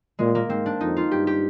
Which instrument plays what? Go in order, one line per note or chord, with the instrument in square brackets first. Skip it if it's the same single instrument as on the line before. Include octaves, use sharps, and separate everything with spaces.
[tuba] A#2 [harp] G#3
[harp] A#3
[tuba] G#2 [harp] C4
[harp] D4
[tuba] F2 [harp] D#4
[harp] F4
[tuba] G2 [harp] G4
[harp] G4